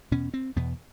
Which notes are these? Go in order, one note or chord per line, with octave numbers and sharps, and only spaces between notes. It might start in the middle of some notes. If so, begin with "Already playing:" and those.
E2 B2 C#4
C4
E2 B2 B3